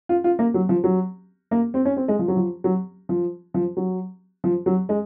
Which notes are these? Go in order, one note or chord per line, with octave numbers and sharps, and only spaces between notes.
F4
F4
A#3
F#3
F3
F#3
A#3
C4
C#4
C4
G#3
F3
F#3
F3
F#3
F3
F3
F#3
F3
F#3
G#3